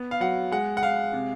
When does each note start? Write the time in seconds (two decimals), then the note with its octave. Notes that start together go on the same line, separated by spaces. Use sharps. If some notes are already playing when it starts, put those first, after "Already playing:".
Already playing: B3
0.11 F5
0.20 F#3 F#5
0.52 G#3 F#5
0.77 F#5
0.83 G#3 F5
1.13 C3